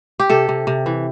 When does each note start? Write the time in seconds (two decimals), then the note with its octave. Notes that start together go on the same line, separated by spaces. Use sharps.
0.20 G4
0.29 C3 A4
0.49 C3
0.67 C3
0.86 E3